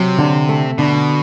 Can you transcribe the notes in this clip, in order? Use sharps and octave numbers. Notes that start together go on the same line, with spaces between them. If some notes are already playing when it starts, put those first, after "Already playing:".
Already playing: C3 F#3
D3
A3
B2 D3